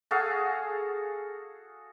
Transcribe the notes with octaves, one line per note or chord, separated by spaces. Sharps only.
F#4 G#4 A4 F5